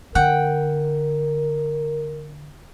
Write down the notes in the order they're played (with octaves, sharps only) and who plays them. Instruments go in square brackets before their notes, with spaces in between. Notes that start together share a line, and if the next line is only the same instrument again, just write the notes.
[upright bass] D3 [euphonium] A#4 [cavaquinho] F#5 G5